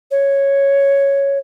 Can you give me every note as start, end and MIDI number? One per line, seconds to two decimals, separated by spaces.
0.11 1.38 73